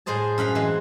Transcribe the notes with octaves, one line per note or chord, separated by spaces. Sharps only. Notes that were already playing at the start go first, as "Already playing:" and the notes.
A2 G#4 C5 D#5 A5
F#2 F5 F#5 B5
E3 G#3 C4